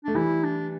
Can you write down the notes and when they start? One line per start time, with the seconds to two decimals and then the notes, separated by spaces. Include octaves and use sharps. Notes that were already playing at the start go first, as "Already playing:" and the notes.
0.04 A3 D4
0.15 E3 G3 E4
0.43 D4